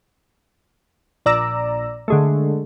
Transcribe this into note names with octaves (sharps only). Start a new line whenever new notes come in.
A#1 D5 A#5 E6
D3 G#3 A3